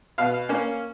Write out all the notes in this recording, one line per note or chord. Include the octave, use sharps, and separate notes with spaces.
B2 F5
A#3 C#4